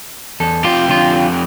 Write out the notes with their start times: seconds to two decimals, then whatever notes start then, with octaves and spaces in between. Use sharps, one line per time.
0.40 E2 A4
0.65 F2 F4 G4
0.88 D3 F4